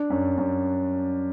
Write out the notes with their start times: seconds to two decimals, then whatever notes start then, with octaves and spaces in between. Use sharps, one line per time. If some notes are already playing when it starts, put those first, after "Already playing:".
Already playing: D4
0.10 F#2
0.38 F#2